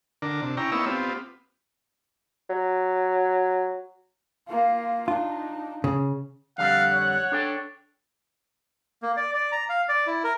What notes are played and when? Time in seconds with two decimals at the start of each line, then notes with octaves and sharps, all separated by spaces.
0.22 D3 D4 A#4
0.42 C3 D4
0.57 C#4 E4 G5 A#5
0.72 A#3 B3 D#4 E4 C#5 E6
0.86 B3 C4 F4 G4
2.50 F#3
4.48 A#3 F4
5.08 D4 D#4 F4
5.84 C#3
6.58 F2 D3 G3 F5 F#5
6.93 C#5
7.32 D4 A4 G5
9.03 A#3
9.17 D5
9.33 D5
9.52 A#5
9.69 F5
9.89 D5
10.07 E4
10.24 A#4